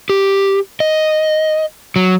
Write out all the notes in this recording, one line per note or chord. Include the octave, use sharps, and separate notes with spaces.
G4
D#5
F#3